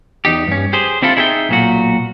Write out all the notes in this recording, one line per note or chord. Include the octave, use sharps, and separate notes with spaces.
E2 D#4 G4
G2 C#4
G4 G#4 C5
D3 C4 E4 F4 A4
D#4 E4 G#4 C#5 E5 G5
B1 A#2 F#4